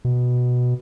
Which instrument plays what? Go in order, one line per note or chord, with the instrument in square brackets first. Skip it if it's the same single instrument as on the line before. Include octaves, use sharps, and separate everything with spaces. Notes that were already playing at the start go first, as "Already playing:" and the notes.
[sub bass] B2